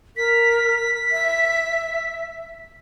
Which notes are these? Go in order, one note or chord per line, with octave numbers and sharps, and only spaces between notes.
A#4 B6
E5